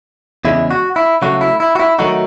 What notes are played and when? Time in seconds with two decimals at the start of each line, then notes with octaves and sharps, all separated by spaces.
0.45 E2 C#3 G#3 E4
0.71 F#4
0.96 E4
1.22 C#3 F#3 A3 F#4
1.41 E4
1.60 E4
1.75 F#4
1.80 E4
1.99 D#3 F#3 A3 D#4 F#4